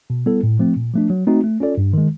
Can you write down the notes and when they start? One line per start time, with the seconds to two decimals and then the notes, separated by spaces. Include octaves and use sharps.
0.10 B2
0.26 G3 B3 E4 A4
0.43 A2
0.59 F3 A3 C4
0.77 A#2
0.93 F3 A3 D4
1.10 F#3
1.27 A3 C4 D#4 F#4
1.44 A3
1.60 C#4 F4 A4 D5
1.77 G2
1.93 D#3 G#3